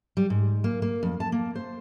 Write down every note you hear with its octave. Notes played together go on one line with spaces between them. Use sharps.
G3
G#2
A#3
A#3
F2
A5
A#3
C5